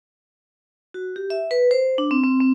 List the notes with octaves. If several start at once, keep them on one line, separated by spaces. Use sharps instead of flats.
F#4
G4
E5
B4
C5
D4
C4
C4
C4